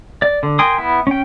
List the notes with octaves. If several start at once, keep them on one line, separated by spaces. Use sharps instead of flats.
D5
D3
A#4 G5 G#5 C6 D#6
B3 E4
C#4 G5